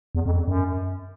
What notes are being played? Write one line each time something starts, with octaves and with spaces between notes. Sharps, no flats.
E2
F2
F#2